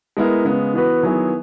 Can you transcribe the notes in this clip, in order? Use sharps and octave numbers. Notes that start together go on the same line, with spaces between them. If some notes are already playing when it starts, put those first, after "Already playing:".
G#3 B3 E4 A#4
C#3 G#3 B3
E3 B3 F#4 B4
D#3 F#3 B3 E4 G#4